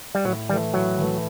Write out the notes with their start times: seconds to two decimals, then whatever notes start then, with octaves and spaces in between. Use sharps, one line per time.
0.15 G3
0.24 A2 F#3
0.49 E3 G3 A3
0.74 A2 F#3
0.98 E3 A3